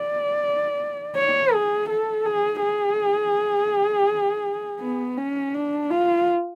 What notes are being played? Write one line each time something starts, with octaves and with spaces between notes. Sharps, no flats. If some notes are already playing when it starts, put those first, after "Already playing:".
Already playing: D5
C#5
G#4
A4
G#4
G#4
B3
C#4
D4
F4